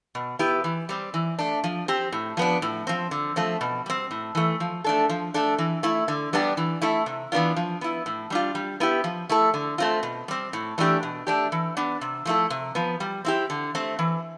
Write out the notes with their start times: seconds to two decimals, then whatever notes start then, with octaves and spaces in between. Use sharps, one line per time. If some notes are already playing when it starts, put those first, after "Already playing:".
0.15 B2
0.39 B3 E4 G4
0.64 E3
0.89 G3 C4
1.14 E3
1.39 A3 D4
1.64 F3
1.88 C4 G4
2.13 A2
2.37 F3 B3 D4
2.62 A2
2.87 F3 C4
3.11 D3
3.36 F3 A3 C4
3.61 B2
3.86 G3 C4
4.11 A2
4.35 E3 A3
4.60 F3
4.84 A3 D4 A4
5.09 F3
5.34 A3 D4 A4
5.58 E3
5.83 A3 E4
6.08 D3
6.33 G3 B3 D4 G4
6.57 E3
6.82 A3 E4 A4
7.06 C3
7.32 E3 B3 D4 F4
7.56 F3
7.81 B3 E4
8.06 A2
8.30 G3 D4 F4
8.55 G3
8.80 B3 E4 G4
9.04 F3
9.29 A3 E4 A4
9.54 D3
9.78 A3 C4 F4
10.03 B2
10.28 G3 C4
10.53 A2
10.78 E3 A3 D4 G4
11.03 B2
11.27 A3 D4 G4
11.52 E3
11.77 B3 D4
12.01 C3
12.25 F3 A3 E4 A4
12.50 C3
12.75 F3 B3
13.00 G3
13.25 C4 E4 G4
13.50 D3
13.75 A3 C4
13.99 E3